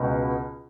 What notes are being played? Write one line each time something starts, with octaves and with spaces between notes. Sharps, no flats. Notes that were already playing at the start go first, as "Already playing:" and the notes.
Already playing: C#2 B2